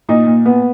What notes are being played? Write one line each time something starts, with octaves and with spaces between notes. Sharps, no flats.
A#2 D#4
A#2
B3